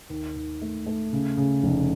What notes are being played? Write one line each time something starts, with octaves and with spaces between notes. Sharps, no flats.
D#2
D#2
A3
A3
C#3
C#3
F1